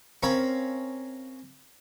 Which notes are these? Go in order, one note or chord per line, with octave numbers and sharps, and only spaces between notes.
C4 C#4 A#4 F5 A#5 B5